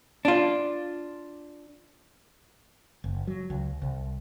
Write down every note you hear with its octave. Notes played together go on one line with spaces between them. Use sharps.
D4 F4
F#1
F#3
C#2
C2